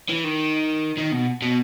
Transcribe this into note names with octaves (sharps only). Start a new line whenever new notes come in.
E3
D#3
D#3
B2
B2